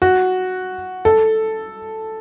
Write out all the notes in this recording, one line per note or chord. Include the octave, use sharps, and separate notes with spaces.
F#4
A4